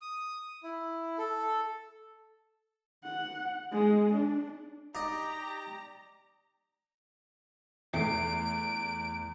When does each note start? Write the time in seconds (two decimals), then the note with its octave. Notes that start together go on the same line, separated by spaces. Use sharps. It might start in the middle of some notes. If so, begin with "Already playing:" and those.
0.02 D#6
0.63 E4
1.18 A4
3.04 F#5
3.72 G#3
4.13 D4
4.95 D#4 G4 D5 D#5 A#5
7.94 E2 A3 C7 D7